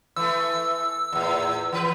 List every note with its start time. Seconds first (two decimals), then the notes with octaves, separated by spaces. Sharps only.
0.16 E3 A3 E6
1.13 E2 A2
1.72 E3 B4